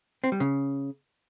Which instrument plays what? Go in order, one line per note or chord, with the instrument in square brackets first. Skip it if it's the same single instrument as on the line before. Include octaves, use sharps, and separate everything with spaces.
[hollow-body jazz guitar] C4
G3
C#3